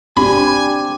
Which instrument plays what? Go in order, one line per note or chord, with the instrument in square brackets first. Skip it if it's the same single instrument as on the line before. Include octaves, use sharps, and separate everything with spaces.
[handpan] C4 D4 G4 [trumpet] G#5 [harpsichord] B5